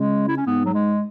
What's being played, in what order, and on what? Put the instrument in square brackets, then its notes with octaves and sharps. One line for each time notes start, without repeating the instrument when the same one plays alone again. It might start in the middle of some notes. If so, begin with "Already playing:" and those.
Already playing: [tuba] C#3 [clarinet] G#3
[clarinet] E4
C#4
[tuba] G#2 [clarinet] B3
[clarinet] F#3
G#3